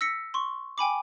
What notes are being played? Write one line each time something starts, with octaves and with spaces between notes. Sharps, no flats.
E6 A#6 B6 C#7
C6 C#6
G5 G#5 B5 D6